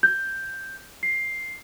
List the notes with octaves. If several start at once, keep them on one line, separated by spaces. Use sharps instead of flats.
G6
C7